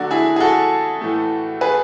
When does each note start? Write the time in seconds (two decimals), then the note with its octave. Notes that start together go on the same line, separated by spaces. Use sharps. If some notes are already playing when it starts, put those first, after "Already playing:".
Already playing: D3 F#3 A3 D4 F#4
0.11 E4 G#4
0.36 G#4
0.40 F#4 A4
1.01 A2 E3 A3
1.61 G#4 B4